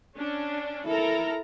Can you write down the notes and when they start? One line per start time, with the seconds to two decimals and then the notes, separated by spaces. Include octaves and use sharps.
0.16 C#4 D4
0.86 E4 A4 A#4 A#5